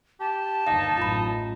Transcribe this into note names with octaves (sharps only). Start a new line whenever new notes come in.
G4 A5
G1 D#2 D#4 F5
A1 F#2 A2 F4 B5